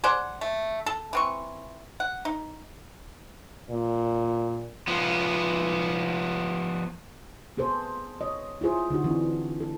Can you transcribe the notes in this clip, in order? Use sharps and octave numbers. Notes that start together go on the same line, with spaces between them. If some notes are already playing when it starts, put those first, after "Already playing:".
G#4 C5 D5 F#5
A3
A4
E3 C4 C#6
F#5
D#4
A#2
F3 B3
B3 G#4 A4 C5
C#5 D#5
E4 F4 G#4 C5
D3 D#4 E4 F#4
E3 C4 D4
A4